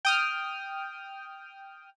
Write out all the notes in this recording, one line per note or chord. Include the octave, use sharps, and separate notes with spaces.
G5 D#6 F6